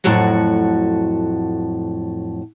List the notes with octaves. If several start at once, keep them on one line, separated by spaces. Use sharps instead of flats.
F2 A2 F#3 F#4 F#5